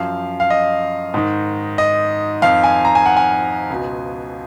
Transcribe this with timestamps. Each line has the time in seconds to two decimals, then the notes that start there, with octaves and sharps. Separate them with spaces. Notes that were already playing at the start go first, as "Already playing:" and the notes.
Already playing: F#2 F3 F5
0.40 F5
0.50 D#5
1.14 G#2 D#3
1.78 D#5
2.42 F2 D#3 F5
2.64 G#5
2.85 A#5
2.95 G#5
3.06 F#5
3.16 G#5
3.70 C#2 B2